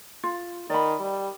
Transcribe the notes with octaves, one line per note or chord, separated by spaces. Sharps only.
F4
D#3 D5 B5
G3